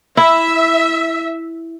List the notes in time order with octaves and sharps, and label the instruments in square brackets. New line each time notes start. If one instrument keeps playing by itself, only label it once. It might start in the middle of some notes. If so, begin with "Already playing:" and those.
[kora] E4 [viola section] E5